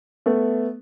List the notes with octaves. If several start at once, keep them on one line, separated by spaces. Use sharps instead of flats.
A3 B3